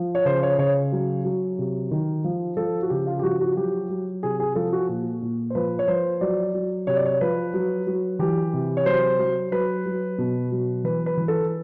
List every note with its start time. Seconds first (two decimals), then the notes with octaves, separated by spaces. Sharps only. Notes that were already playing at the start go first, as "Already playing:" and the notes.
Already playing: F3
0.15 C#5
0.25 C#3 C5
0.43 C#5
0.58 C#3 C#5
0.92 F#3
1.25 F#3
1.59 C3
1.91 D#3
2.24 F3
2.57 F3 A4
2.82 F#4
2.90 C#3 G4
3.07 F4
3.19 G4
3.23 F3 F#4
3.40 F#4
3.56 F#3 G4
3.89 F#3
4.23 C3 G#4
4.40 G#4
4.55 F3 A4
4.73 F#4
4.89 A#2
5.22 A#2
5.50 C5
5.55 F3 B4
5.79 C#5
5.88 F3 C5
6.21 F#3 D5
6.54 F#3
6.87 C3 C#5
6.97 D5
7.05 C#5
7.21 F3 B4
7.54 F#3
7.87 F#3
8.19 E3 G4
8.54 C3
8.77 C#5
8.85 F#3 C5
9.19 F#3
9.52 F#3 B4
9.86 F#3
10.18 B2
10.51 F#3
10.84 E3 B4
11.06 B4
11.17 E3
11.28 A4